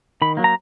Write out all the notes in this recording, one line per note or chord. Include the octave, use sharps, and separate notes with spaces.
D#3 B5
F#3 A#3
A#5